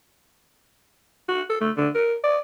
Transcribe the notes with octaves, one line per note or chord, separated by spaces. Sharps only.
F#4
A4
A3
D3
A#4
D5